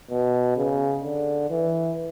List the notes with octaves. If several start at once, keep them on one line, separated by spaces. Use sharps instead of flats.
B2
C#3
D3
E3